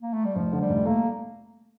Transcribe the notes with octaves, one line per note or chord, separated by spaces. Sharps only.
A#3
A3
G3
F1 F3
D3
G3
F1
A3 A#3